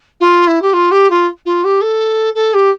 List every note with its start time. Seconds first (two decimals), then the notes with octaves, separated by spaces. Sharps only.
0.20 F4
0.47 E4
0.62 G4
0.73 F4
0.91 G4
1.10 F4
1.45 F4
1.64 G4
1.81 A4
2.35 A4
2.54 G4